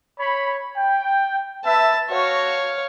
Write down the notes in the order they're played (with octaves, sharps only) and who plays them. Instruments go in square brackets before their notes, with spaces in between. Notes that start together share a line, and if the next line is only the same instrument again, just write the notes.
[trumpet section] C#5 B5
G5
[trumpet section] B4 E5 [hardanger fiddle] A5
[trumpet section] F#4 [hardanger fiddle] C#5 F5